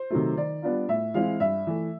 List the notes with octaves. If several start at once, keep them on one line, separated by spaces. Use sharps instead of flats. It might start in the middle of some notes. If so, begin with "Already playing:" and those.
Already playing: C5
C3 D#3 F#3 A3
D#3 D5
G3 B3 D4 F4
A2 E5
E3 G#3 C4 E4 F5
G2 E5
E3 A3